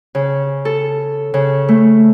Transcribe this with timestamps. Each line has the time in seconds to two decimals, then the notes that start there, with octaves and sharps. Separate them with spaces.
0.15 C#3
0.65 A4
1.34 C#3
1.69 A3